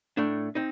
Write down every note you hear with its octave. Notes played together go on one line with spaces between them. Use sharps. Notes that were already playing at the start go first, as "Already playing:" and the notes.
A2 A3 D4
C4 D#4